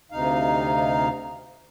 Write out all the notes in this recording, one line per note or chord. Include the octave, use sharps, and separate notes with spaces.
D2 C3 D#4 F5